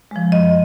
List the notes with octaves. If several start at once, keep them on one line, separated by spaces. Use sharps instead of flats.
F3 G#3
F#2 D#5